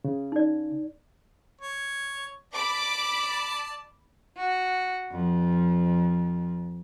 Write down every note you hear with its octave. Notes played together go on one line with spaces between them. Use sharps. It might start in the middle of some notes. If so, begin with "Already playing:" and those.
C#3
D#4 D5
C#5
D5 A5 B5 D6
F#4
F2